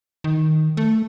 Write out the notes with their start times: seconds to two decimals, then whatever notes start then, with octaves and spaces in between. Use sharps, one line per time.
0.24 D#3
0.77 A3